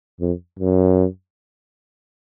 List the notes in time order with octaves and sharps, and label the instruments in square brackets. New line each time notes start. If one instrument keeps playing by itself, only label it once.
[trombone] F2
F#2